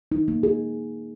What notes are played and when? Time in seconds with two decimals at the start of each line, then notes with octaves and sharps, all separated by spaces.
0.12 D#4
0.28 A#3
0.43 G#4